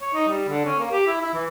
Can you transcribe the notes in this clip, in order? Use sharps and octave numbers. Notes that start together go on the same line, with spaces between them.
C#5
D#4
G3
D3
C#4
A#3
G4
E4
E4
E3